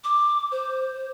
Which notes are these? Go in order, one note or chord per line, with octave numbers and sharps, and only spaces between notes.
D6
C5